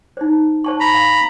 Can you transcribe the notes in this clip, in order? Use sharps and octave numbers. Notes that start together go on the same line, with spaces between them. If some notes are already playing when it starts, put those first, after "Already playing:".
D#4 C5
C5 A5 C#6
A#5 B5
F5